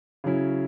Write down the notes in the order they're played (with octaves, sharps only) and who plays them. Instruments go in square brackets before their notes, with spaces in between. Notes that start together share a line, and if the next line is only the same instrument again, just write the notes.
[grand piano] C#3 F#3 C#4 E4